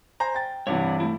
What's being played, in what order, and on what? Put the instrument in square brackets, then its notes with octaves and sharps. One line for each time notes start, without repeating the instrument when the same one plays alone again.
[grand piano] C5 G#5 A#5
G5 A6
[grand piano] G2 C3 E3 [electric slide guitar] C#5 D5 F#5
[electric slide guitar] A3 E4